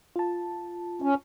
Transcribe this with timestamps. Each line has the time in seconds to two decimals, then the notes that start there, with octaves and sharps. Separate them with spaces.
0.16 F4 A5
1.02 C#4